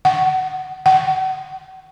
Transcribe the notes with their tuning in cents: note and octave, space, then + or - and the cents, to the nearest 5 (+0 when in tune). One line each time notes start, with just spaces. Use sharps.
F#5 +15
F#5 +30